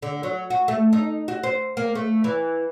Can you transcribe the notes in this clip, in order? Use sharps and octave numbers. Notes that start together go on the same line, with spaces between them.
D3
F#3
F#4
A3
D#4
F#4
C5
A#3
A3
E3